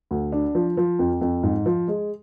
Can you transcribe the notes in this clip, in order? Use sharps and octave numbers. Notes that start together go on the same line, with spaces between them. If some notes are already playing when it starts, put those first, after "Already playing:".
D2
D4
F3
F3
F2
F2
G#2
F3
G#3